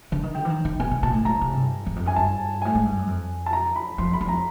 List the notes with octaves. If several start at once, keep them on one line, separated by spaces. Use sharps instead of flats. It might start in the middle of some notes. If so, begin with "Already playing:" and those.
D3
D#3
D3 G5
E3
D#3
D#3
B2 G#5
B2
A#2 A5
A2
A#2 A#5
C3
G2
E2
F2
F#2 G#5
G2 A5
A2 G#5
G#2
G2
F#2
F2
A5
A#5
B5
F2 C6
B5
F2
A#5